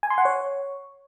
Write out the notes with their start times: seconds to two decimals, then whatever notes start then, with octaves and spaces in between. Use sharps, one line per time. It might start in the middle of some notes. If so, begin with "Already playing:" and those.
0.03 G#5
0.10 C6
0.18 F#5
0.25 C#5